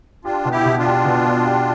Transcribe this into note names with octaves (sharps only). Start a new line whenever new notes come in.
D4 F4 G4
B2
E4 G4
B2
D4 F4
G4
B2
B3
G4